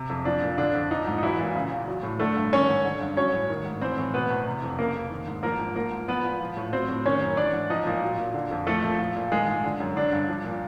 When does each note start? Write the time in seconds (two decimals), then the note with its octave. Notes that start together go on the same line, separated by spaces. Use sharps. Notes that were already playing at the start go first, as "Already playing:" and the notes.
Already playing: C3
0.10 F2
0.25 F3 D4
0.42 A#2
0.58 D3 D4
0.75 F2
0.91 F3 D#4
1.07 G#2
1.18 D#4
1.23 E3 F#3 E4
1.39 A#2
1.55 C#3
1.71 E2
1.88 F#3
2.03 A2
2.19 D3 A3 A4
2.37 G2
2.52 D#3 C#4 C#5
2.69 G#2
2.85 D3
3.01 G2
3.17 F#3 C#4 C#5
3.33 A2
3.50 D#3
3.65 G#2
3.81 E3 C4 C5
3.98 A2
4.14 B2 B3 B4
4.30 E2
4.47 C3
4.63 F2
4.78 C#3 A#3 A#4
4.95 F2
5.10 D#3
5.27 G#2
5.43 F3 A#3 A#4
5.60 G#2
5.75 F3 A#3 A#4
5.92 G#2
6.08 F3 B3 B4
6.24 A#2
6.41 F3
6.57 A2
6.73 F#3 C4 C5
6.89 A2
7.05 D#3 C#4 C#5
7.21 F#2
7.37 E3 D4 D5
7.53 G#2
7.70 F3 D#4 D#5
7.87 A#2
8.02 F#3
8.18 A#2
8.34 D3
8.51 F2
8.67 F3 A3 A4
8.83 A#2
8.99 F3
9.16 A#2
9.31 D#3 G#3 G#4
9.48 G#2
9.64 D3
9.80 F#2
9.96 D3 D4
10.13 G2
10.28 F3
10.44 A#2